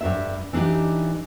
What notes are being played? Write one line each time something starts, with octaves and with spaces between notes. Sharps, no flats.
G2 C#3 E5
E3 D4 D#4 G4